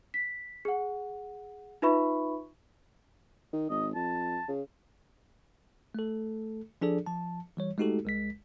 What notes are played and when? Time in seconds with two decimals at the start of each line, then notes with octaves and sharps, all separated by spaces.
0.14 B6
0.65 G#4 F#5
1.82 D#4 F4 B4 E5 B5 C#6
3.53 D#3
3.70 G#1 D#5
3.95 F2 A5
4.48 C#3
5.95 A3 A4
6.81 F3 D4 G#4 A4 D5
7.06 F3 A5
7.57 E3 G3 C#5
7.78 G#3 A3 D#4 F#4 G4 A4
8.05 C2 G#3 B6